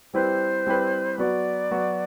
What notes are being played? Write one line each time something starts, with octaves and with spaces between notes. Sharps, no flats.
G3 C4 E4 G4 B4 C5
G3 C4 E4 G4 B4
F#3 B3 F#4 D5
F#3 B3 F#4